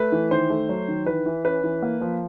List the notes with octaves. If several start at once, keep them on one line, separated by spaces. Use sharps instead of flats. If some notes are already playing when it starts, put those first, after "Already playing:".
Already playing: A3 B4
E3
D#3 C5
A3
F#3
D#3
E3 B4
E3
C#4 B4
E3
A#3
F3